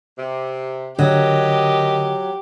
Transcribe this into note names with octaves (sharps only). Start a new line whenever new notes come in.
C3
D3 F#3 G4 A#4 D#5